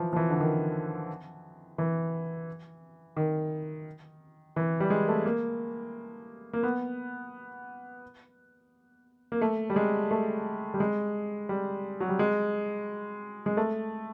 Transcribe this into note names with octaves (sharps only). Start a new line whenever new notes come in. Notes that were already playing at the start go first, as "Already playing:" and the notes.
Already playing: E3 F3
F3
E3
D3
D#3
E3
D#3
E3
G3
G#3
A3
A#3
A#3
B3
A#3
A3
G3
G#3
A3
G3
G#3
G3
F#3
G3
G#3
G#3
A3